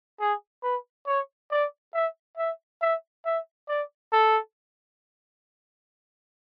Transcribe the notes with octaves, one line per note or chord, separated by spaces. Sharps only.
G#4
B4
C#5
D5
E5
E5
E5
E5
D5
A4